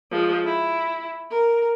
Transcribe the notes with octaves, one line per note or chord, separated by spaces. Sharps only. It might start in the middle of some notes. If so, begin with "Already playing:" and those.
F3 G#3
E4
A#4